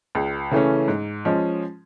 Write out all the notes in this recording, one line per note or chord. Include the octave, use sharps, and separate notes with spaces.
C#2
C#3 E3 A3 C#4
G#2
F3 G#3 C#4